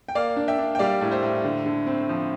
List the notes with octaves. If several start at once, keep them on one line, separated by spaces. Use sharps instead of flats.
G5
A#3 D5 F5
D4
E5 G5
D4
G5
G3 D5 F5
A2
C5 E5
A2
D3
D3
C4
F3